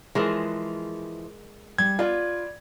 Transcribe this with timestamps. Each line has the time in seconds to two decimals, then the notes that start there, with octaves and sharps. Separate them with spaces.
0.15 E3 F3 G#3 G#4 A#4
1.78 G3 G#6
1.99 F4 B4 D5